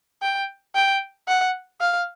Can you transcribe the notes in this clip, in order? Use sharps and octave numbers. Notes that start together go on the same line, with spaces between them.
G5
G5
F#5
F5